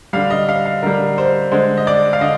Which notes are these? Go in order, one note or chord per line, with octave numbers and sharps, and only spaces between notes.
D3 G3 F5
D#5
F5
F5
D3 G3 A#4
C5
D3 G#3 C5
D#5
D5
F5
D3 D#5